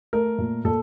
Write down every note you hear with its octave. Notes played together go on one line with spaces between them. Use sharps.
A3 A#4
A#2
A#2 A4